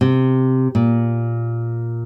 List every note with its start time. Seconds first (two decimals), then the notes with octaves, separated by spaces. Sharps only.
0.01 C3
0.75 A#2